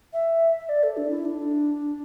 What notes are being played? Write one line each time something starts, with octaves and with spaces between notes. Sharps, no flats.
E5
D5
A4
D4
E4
D4